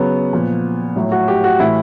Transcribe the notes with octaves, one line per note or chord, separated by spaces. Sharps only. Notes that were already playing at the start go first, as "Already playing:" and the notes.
Already playing: C#3 F#3 B3
A#2 F3
A2 F#3
F#4
G4
F#4
A2 E3 E4